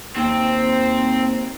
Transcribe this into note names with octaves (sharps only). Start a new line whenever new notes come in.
D#2 C4